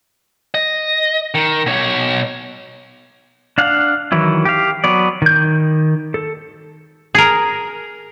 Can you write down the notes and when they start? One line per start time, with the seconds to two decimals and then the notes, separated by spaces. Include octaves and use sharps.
0.54 D#5
1.35 D#3
1.66 B2 C#5
3.58 D4 F5 F#5
4.12 D#3 E3 F#3 E4
4.45 G4 F5
4.84 F#3 B3 D5
5.22 D#3 G6
6.14 A4
7.15 G#4 A#4